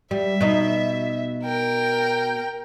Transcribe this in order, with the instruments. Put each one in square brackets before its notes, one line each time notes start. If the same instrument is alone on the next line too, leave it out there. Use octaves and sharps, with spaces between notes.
[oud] G3 [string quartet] E5
[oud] B2 D#4
[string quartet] A#4 G5